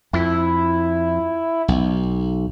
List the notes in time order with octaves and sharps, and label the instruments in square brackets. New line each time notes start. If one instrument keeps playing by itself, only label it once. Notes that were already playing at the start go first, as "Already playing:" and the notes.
[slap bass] F2 [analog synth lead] E4
[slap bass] B1